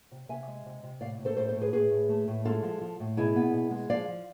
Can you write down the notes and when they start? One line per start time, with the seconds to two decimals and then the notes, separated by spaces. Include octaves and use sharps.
0.11 C3
0.29 C3 E5 G#5
0.48 G#3
0.66 C3
0.83 C3
1.01 A2 D5 F5
1.19 A2
1.25 A4 C5
1.37 A2 A4 C5
1.49 A4 C5
1.56 A2
1.61 G#4 B4
1.73 A2 G#4 B4
1.91 A2
2.09 A3
2.28 A2
2.45 G#3 F4 A4
2.63 F3
2.81 F3
3.00 A2
3.17 B2 E4 G#4
3.36 B3
3.54 B2
3.71 G#3
3.90 F3 D5 F5
4.08 F3